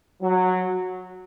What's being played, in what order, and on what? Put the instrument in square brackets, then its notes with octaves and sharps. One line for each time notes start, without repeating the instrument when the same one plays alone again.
[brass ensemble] F#3